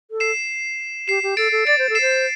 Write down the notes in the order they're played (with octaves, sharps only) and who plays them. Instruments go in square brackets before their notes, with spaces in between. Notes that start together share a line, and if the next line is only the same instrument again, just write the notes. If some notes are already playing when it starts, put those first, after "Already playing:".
[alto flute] A4
[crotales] C7 E7
[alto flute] G4 [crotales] C7 E7
[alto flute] G4
[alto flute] A4 [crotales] A6 D7
[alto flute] A4
[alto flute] D5 [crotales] A6 D7
[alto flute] C5
A4
[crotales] C7 E7
[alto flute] C5